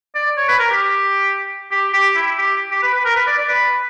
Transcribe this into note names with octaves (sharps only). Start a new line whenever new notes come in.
D5
C#5
B4
A#4
G4
G4
G4
E4
G4
G4
B4
B4
A#4
B4
D5
D5
B4